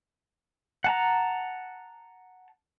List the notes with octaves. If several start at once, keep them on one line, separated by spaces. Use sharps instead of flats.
F#5 A5 A#5